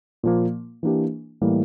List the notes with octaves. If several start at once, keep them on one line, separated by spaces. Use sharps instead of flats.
A#2 F3 A#3
E3 A#3 D4 G4
A2 E3 G3 A#3